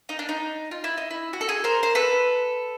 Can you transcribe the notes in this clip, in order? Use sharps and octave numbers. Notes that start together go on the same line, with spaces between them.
D#4
D4
D#4
F4
E4
D#4
E4
F#4
A4
G#4
A#4 C5
C5
A4 B4